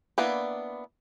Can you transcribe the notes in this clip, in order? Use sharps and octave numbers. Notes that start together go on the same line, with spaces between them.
A#3 B3 D4 E4 B4